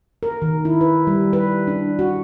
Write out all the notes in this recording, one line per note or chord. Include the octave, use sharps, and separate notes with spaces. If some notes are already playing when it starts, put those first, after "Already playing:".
A#4
D#3
E4
B4
G3
B4
D4
F#4